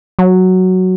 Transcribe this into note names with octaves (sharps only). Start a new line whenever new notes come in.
F#3